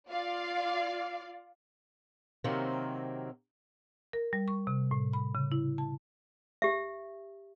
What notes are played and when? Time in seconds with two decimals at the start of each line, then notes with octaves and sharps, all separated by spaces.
0.10 F4 D5 F5
2.44 C3 D#3 F#3 A#3 C4
4.13 A#4
4.33 G3
4.48 C#6
4.67 C3
4.91 A2
5.13 B5
5.35 C#3
5.52 E4
5.78 A5
6.62 G4 E5